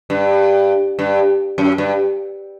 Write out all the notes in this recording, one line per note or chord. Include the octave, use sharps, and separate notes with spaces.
G2
G2
F#2
G2